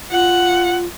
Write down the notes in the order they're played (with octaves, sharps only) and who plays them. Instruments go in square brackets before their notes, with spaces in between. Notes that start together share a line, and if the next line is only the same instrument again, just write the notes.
[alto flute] F4 [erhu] F#5